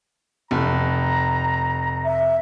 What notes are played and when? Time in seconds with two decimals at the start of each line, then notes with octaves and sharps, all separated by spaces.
0.51 F1 A#5
2.05 E5